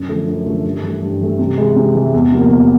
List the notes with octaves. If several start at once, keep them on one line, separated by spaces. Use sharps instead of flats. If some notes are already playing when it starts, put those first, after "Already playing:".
Already playing: F#2
D3 F3 A3 D4
F#2
D3 F3 A3 D4
G2
E3 A3
G2
E3 A3
C3
E3 G#3
C3
E3 G#3
E2
C3 F3 A#3
E2